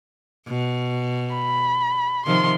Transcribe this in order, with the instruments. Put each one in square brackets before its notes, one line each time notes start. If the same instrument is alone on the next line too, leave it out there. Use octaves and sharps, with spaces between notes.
[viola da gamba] B2
[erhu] B5
[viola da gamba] C3 D#3 F3 [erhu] C6